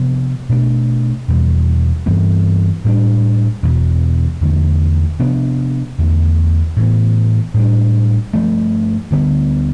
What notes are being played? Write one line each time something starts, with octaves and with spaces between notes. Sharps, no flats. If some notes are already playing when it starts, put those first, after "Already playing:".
Already playing: C3 F3 B3 D4
B2 A3 D4
E2 B2 G3
G2 E3 G3 B3
A2 G3 D4
E2 B2 B3
E2 D3 F3 A3
C3 F3 B3 D4
E2 D3 A3
A2 E3 B3
A2 G3 D4
G2 F3 A3
D2 D3 G3 B3